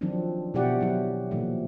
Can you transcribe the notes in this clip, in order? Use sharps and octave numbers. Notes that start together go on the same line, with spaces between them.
D#3 F3 F#3 C4 D4
B2 E4 F#4 G4 D5 F#5
F#3 E4 G4
A#2 D#3 F3 A3